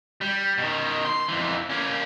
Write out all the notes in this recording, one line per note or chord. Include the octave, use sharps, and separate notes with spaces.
G3
B2 D#3
C6
F2 E3
A#3 C#4